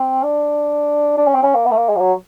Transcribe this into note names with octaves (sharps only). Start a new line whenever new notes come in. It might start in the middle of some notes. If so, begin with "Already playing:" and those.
Already playing: C4
D4
D4
C#4
C4
C#4
A#3
B3
A3
A#3
G#3
F3
F#3